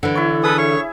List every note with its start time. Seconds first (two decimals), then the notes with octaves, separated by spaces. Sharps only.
0.03 D3 E3
0.15 E4 C#5
0.43 G#4 A4 B4 E5 D#6
0.58 C#5 E5 C#6